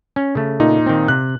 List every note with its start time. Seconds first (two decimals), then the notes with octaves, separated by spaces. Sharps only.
0.16 C#4
0.35 C#3 A3
0.60 A#2 D#4
0.86 D#3 C4
1.08 C3 F#6